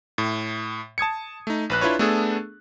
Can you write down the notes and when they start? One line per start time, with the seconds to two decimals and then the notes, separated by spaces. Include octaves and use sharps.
0.18 A2
0.98 A5 D#6 G#6 C#7
1.47 A3 D#4
1.70 A#1 B4 F#6
1.81 D4 E4 F4 B4 C#5
1.99 A3 B3 D4 G#4 A4